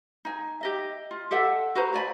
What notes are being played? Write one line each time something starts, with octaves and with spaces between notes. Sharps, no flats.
D#4 G#5
G4 D#5 E5
F4
G4 A4 E5 F#5
F#4 B4 C5 A#5
F#4 D5 G#5 B5